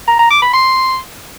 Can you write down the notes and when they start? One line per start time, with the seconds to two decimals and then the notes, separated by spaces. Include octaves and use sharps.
0.08 A#5
0.19 A#5
0.31 D6
0.42 B5
0.53 C6